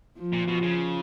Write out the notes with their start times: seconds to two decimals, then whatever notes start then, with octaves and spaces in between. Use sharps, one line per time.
0.18 F3
0.33 A#2
0.48 B2
0.62 C#3